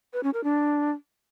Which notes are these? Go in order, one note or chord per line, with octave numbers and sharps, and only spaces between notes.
B4
C#4
A#4
D4